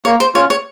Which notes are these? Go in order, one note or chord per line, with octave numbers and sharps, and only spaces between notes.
A#3 C#5
C5
C#4 F4 C#5
C#5